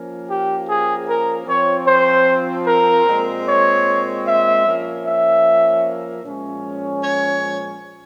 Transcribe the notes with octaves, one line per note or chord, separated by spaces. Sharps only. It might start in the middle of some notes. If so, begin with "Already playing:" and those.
Already playing: F3 A#3 C#4
G4
G#4
A#4
F3 C4 C#5
C5
A#4
A#2 G#3 C4
C#5
E5
F3 A#3 C#4
E5
A#2 F3 G#3 C#4
C#5